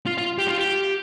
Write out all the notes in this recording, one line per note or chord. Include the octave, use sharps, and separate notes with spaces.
F4
F4
G4
F4
G4